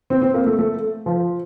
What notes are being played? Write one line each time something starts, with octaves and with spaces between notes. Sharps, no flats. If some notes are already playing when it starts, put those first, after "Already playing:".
C4
C4
A#3
A3
A3
F3